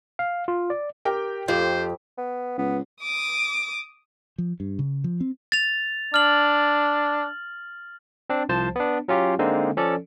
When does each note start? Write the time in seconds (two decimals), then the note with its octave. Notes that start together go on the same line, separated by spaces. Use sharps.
0.19 F5
0.48 F4
0.70 D5
1.05 G4 A#4 G5
1.48 F2 F4 G4 C5
2.18 B3
2.58 C#2 B3
3.02 D6 D#6
4.38 F3
4.60 G2
4.79 C#3
5.04 F3
5.21 C4
5.52 A6 F7
6.14 D4 F6 F#7
8.30 C4 D4
8.49 C2 F3 C5 A5
8.76 B3 D4
9.08 F#3 C#4 F4 G4
9.39 D3 G#3 A#3 C4 D#4
9.77 F3 C#4 A4 D5